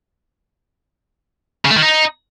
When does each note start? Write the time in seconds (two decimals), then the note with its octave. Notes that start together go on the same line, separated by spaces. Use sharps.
1.65 C#3
1.71 A3
1.76 D#3
1.82 D#4